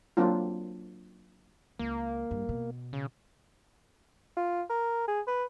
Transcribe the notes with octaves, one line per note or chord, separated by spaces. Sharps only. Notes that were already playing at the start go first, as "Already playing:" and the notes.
F#3 A#3 C4 D4 F4
C#2 A#3
G2
B2
C#3
F4
A#4
G#4
B4